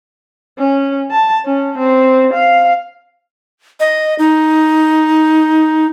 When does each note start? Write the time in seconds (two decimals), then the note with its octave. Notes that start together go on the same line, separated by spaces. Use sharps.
0.59 C#4
1.11 A5
1.46 C#4
1.78 C4
2.34 F5
3.80 D#5
4.19 D#4